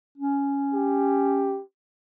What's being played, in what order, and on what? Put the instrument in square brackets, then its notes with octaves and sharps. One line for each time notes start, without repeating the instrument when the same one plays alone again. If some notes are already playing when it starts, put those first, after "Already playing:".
[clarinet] C#4
[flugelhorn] G4